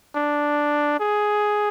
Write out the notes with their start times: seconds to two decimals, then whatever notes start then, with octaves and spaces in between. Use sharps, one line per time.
0.15 D4
1.00 G#4